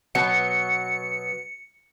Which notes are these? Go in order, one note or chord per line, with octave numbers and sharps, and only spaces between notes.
B2 F#3 B3 C#7